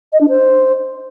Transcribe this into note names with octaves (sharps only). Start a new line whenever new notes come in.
D#5
D4
C5